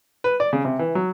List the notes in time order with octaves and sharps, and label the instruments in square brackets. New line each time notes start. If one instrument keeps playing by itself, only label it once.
[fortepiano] B4
D5
C#3
C3
E3
F#3